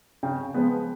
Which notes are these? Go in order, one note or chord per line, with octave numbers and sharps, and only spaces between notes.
C#3 G5
F3 G#3 B3